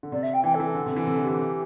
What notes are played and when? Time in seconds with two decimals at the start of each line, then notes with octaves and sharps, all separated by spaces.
0.03 D3
0.12 C3 D5
0.22 E5
0.33 G5
0.44 E3 G5
0.54 A4
0.60 E3
0.65 A4
0.75 D3
0.86 C3
0.96 E3
1.07 C3 A4
1.17 D3
1.23 E3 G4